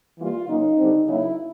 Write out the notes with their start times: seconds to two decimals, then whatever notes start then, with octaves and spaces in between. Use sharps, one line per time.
0.18 E3 G3 A#3 F4
0.48 C#3 F#3 A#3 C#4 D#4
0.77 D3 G3 C4
1.07 C#3 F#3 A#3 D#4 E4